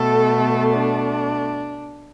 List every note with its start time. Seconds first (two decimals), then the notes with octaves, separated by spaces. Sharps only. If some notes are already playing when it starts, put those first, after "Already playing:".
Already playing: B2 A3 A4
0.74 D4